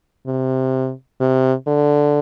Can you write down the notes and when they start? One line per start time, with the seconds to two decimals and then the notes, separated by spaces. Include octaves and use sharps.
0.27 C3
1.20 C3
1.67 D3